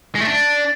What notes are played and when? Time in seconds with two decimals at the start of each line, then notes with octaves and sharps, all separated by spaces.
0.15 G#3
0.21 A3
0.27 D4